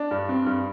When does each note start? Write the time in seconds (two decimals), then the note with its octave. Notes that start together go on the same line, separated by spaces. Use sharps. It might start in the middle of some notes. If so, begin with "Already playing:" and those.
Already playing: D4
0.11 G2
0.29 C4
0.46 G2